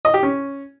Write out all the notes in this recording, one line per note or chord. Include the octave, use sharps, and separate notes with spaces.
D#5
G4
C#4